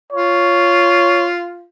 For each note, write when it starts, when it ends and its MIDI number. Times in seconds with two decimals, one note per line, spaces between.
0.12 1.66 65
0.12 1.28 73